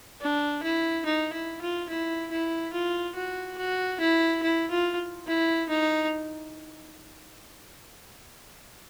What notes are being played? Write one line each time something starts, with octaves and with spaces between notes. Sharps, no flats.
D4
E4
D#4
E4
F4
E4
E4
F4
F#4
F#4
E4
E4
F4
E4
D#4